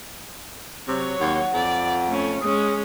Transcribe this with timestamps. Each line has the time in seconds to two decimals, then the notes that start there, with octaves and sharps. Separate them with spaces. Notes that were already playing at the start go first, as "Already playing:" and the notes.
0.88 C3 F#3 C#5
1.20 D#2 F#5
1.54 F2 D5
2.08 A3 C#4
2.41 G#3 C#4 D#6